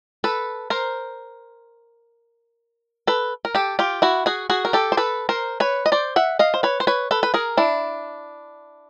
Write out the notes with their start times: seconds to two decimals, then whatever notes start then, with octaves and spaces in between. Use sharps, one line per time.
0.24 A4 B4
0.70 A#4 C5
3.07 A4 B4
3.45 A#4
3.55 G4 A4
3.79 F4 G4
4.02 E4 F#4
4.26 F#4 G#4
4.50 F#4 G#4
4.65 A#4
4.73 G4 A4
4.92 C5
4.97 A4 B4
5.29 A#4 C5
5.60 B4 C#5
5.86 D#5
5.92 C5 D5
6.16 E5 F#5
6.39 D#5 F5
6.54 C5
6.63 B4 C#5
6.80 C5
6.87 B4 C#5
7.11 A4 B4
7.23 B4
7.34 G#4 A#4
7.57 D4 E4